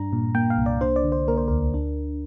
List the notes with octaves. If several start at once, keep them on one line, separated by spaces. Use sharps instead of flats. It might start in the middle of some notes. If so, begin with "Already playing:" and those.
Already playing: G2 D4 A#5
A#2
A#3 G5
F5
C2
D5
D4 C5
D5
D3
C5
A#3 A#4
C5
D2 A#4
D4